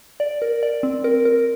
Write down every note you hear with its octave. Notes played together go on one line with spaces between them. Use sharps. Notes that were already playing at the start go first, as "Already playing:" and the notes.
D5
A#4
D5
C4
A#4
A#4